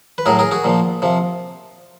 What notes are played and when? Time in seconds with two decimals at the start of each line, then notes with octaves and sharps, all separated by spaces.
0.18 B4
0.26 A2 F#3 G#4 A#4
0.39 G#4 A#4
0.51 F#4 G#4
0.64 A#2 F3
1.02 C3 F3